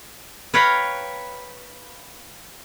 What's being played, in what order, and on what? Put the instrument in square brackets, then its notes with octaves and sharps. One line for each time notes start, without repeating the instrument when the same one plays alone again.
[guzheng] B4 C#5 F5 G5 A#5 B5